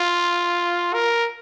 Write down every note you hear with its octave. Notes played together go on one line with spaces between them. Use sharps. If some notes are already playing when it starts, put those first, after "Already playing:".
Already playing: F4
A#4